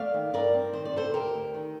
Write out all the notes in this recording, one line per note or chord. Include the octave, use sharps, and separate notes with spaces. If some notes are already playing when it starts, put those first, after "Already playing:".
Already playing: A3 D5 F5
D#3
G2 A#4 D5
C4
D#3 C5
D5
C3 A4 C5
D2 G4 A#4
D2
D#3